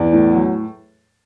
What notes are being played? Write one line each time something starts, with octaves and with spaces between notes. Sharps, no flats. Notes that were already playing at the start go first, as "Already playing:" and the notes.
Already playing: E2 D5
A2
F#3